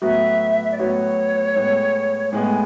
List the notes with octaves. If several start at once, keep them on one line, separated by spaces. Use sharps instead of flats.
A2 F#3 B3 F#4 E5
E5
D5
A2 F#3 B3 F#4 C#5
A2 G#3 B3
A2 G#3 B3 G#5